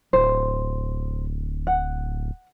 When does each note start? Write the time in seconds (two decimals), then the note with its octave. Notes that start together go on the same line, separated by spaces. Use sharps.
0.13 D1 C5
1.67 F#5